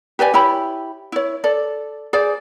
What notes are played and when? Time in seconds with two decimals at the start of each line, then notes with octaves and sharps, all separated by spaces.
0.19 G4 B4 D5 G#5
0.34 E4 G4 C#5 B5
1.12 E4 C#5
1.44 A4 D5
2.13 G#4 C5 D5